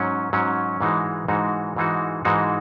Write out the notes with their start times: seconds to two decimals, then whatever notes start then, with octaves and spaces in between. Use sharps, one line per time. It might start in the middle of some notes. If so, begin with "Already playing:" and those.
Already playing: G#2 F#3 C#4
0.33 G#2 F#3 C#4
0.80 G#2 E3 G#3 D#4 F#4
1.28 G#2 E3 G#3 D#4 F#4
1.76 G#2 E3 G#3 D#4 F#4
2.25 G#2 E3 G#3 D#4 F#4